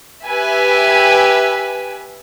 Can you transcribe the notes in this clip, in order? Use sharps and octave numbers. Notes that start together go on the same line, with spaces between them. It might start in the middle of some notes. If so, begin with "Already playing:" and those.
G4 B4 E5 G#5